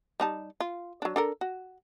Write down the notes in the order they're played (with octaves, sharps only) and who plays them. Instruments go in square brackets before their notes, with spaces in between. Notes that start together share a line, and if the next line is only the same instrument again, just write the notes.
[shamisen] G3 D#4 A5
F4
F#3 D4
D4 A4 A#4
F#4